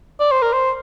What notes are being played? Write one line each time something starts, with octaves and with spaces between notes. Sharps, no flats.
D5
C5
A#4
C5